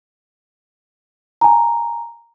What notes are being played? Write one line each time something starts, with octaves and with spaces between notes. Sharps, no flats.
G#5 A#5